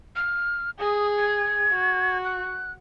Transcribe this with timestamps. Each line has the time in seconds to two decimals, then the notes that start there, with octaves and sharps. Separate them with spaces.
0.16 F6
0.79 G#4 D#6
1.17 G#6
1.72 F#4
2.25 F#6